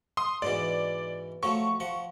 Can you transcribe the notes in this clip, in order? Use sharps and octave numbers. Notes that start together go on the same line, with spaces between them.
C6 D#6
G#2 B2 E3 D5
F3 F#3 A3 C#6
F3 F#5